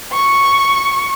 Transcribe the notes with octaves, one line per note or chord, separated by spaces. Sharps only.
C#6